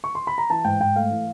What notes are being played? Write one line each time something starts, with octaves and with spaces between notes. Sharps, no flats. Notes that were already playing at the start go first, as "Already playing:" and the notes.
C#6
C6
B5
A#5
E3 A5
G#2 G5
G#2 G5
A3 F5
E3